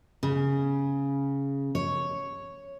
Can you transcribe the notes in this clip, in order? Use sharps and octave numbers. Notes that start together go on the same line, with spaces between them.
C#3
C#5